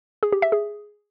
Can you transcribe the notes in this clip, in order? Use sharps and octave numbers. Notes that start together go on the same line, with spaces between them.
G#4
G4
E5
G#4